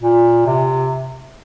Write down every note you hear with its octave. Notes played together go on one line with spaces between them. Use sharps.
A#2
C3